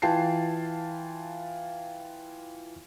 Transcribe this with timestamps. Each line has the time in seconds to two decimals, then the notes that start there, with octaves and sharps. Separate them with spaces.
0.02 E3 F4 G5 A5 C7